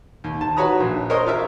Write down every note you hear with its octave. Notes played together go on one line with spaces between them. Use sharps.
D#2
A5
F#4 B4 C#5 A#5 B5 D#6
A#1
A#4 C5 C#5 D#5
F4 A#4 E5